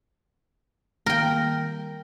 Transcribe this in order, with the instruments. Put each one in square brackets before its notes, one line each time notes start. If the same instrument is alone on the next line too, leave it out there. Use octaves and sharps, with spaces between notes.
[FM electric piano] D#3 G3 A#3 [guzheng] A#4 G5